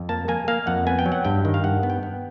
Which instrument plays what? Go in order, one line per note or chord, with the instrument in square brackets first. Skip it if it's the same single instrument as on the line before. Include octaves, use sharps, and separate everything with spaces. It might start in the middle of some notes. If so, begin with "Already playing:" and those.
Already playing: [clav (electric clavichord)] F2
A#3 A5
A#3 G#5
A#3 F5
F2 F#5
B3 G#5
G5
F#3
F#5
G2 G5
D#3
F5
G2 F#5
B3
G5
B3